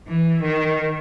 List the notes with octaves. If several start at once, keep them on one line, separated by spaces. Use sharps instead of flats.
E3
D#3